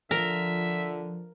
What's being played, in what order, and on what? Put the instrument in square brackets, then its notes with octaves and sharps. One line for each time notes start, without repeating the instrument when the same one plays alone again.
[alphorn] D3 [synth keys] F3 [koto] A#4 [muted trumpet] E5